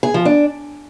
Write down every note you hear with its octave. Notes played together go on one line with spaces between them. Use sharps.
G#4
F3
D4